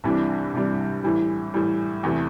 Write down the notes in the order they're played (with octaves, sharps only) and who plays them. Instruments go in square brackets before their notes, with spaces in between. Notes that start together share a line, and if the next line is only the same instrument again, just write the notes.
[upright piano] C2 C3 E3 G3 D4
C2 C3 E3 G3 D4
A2 E3 G3
A2 E3 G3
E2 C3 E3 A3